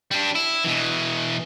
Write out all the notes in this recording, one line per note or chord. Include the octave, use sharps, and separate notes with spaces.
G3 D4
E4
B2 E3